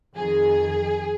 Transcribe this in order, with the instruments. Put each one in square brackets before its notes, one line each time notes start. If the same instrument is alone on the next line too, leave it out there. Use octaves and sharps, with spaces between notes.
[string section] F2 D#3 G#4